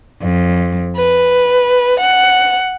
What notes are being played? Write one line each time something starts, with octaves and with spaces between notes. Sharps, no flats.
F2
B4
F#5